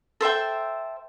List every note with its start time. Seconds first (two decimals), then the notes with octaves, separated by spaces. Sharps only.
0.21 A4 C5 E5 G5